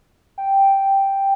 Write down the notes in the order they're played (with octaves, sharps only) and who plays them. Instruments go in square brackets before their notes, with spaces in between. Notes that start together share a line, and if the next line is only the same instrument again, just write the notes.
[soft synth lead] G5